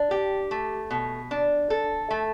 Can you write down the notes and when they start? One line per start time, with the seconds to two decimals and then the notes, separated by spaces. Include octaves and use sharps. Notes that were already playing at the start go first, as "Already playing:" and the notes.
Already playing: D4
0.11 G4
0.51 A3
0.90 B2
1.31 D4
1.70 A4
2.10 A3